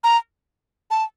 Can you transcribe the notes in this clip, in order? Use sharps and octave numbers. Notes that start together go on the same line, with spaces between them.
A#5
A5